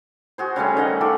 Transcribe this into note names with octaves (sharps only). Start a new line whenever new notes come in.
F#4 G#4 C5
C#3 G3 A3 C#4
D#3 D#5 F#5
F4 A4 F#5 D6